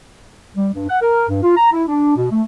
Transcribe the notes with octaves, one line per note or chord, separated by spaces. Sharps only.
G3
G2
F#5
A#4
G2
F4
A#5
E4
D4
B2
A3